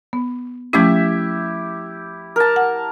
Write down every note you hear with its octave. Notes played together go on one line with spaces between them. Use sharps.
B3
F3 A3 C#4 E4 G4 E5
A#4 A5
F#5